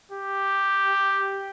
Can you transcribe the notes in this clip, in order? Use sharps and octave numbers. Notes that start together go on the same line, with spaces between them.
G4